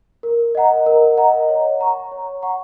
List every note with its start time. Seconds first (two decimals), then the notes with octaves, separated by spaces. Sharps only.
0.23 A#4
0.55 D#5 F#5 A#5
0.86 A#4
1.17 D#5 F#5 A#5
1.49 C#5
1.80 F#5 A#5 C#6
2.12 C#5
2.42 F#5 A#5 C#6